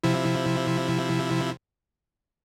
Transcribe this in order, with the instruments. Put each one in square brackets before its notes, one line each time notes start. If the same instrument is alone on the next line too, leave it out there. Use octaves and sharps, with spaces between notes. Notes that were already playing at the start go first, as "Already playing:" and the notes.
[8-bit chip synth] C3 F3 E4